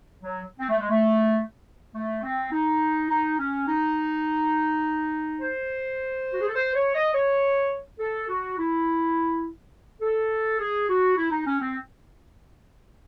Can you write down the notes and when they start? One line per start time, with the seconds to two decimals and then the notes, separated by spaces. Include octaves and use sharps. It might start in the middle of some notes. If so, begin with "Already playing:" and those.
0.21 F#3
0.59 C4
0.69 A3
0.79 G#3
0.90 A3
1.94 A3
2.23 C4
2.51 D#4
3.10 D#4
3.38 C#4
3.68 D#4
5.41 C5
6.33 F#4
6.41 G#4
6.48 A4
6.55 C5
6.74 C#5
6.95 D#5
7.14 C#5
7.99 A4
8.29 F#4
8.58 E4
10.01 A4
10.59 G#4
10.89 F#4
11.16 E4
11.31 D#4
11.46 C#4
11.61 C4